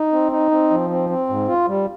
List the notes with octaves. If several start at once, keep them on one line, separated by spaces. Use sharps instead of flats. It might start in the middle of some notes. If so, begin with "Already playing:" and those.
Already playing: D#4
C4
D#4
C4
F3
C4
C4
G#2
F4
G3